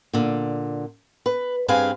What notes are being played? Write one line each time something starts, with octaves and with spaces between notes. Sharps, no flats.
A#2 D3
B4
G2 C4 G#4 B4 F5 G#5